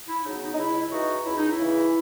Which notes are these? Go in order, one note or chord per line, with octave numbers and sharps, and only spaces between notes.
E4
C#3 F#3 B3 D#4
D#4
D#4
C#2 E4
C#3 E3 D#4 F#4
C#2 E4
D#4
E4
C#3 E3